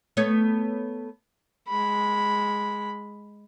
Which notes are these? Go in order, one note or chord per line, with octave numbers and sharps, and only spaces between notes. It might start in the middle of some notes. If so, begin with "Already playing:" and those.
A3 B3 C#5
G#3 B5